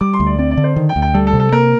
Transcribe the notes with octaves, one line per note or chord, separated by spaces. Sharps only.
G3 D6
C6
D2
D5
C4 D5
D5
D3
C5
D#3
G5
D2
G5
G3 A4
A4
C3
A4
A#3 A#4